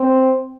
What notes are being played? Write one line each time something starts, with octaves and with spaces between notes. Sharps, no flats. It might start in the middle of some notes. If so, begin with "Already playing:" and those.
Already playing: C4